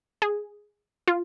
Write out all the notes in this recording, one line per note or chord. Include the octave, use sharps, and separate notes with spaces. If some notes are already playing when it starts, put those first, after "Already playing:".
G#4
F4